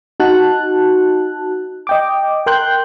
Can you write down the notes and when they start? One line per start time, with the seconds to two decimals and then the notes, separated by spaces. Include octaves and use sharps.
0.20 D#4 F#4 A5 F#6
1.87 D#5 G5 D6
2.46 A#4 G5 C6 F#6 G6